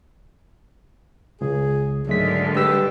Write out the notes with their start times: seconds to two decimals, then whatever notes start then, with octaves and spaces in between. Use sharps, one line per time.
1.41 C#2 G#4
2.07 G#2 D3 D#3 F#3 G#3 A3 B6
2.56 G3 G4 B4 E6